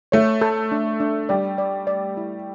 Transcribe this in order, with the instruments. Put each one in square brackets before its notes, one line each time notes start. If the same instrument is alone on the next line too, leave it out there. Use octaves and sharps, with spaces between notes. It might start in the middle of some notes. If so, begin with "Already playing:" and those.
[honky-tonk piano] A3 [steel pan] C#5
[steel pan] A4
D4
D4
[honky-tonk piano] G3 [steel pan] D5
[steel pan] D5
D5
E4